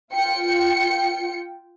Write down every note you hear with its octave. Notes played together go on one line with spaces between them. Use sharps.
F4 G5 C#7